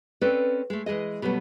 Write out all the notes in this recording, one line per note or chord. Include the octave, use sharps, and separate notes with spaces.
C4 C#4 A4 B4 D5
G#3 A3
E3 G#3 G#4 D#5
B2 F#3 G3 A3 B3